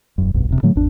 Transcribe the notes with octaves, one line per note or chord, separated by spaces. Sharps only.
E1 F#2
F1 B1 G2
D#1 C3
A2 D3 F#3 A3
G#1 E2 D4